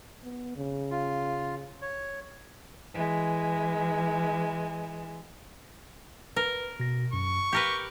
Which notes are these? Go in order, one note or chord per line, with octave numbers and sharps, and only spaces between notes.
B3
C#3
F4
C#5
E3 G#3
A#4 B4
B2 A#6
F#2 C#6
G4 A#4 B4 G6 C#7